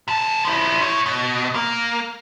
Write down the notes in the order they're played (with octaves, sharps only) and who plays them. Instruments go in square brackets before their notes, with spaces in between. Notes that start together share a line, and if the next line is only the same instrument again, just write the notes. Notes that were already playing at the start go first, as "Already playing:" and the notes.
[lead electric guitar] C3 A5
F3 E4
E4 C#5
B2
A#3